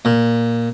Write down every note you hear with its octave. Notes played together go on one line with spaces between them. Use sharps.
A#2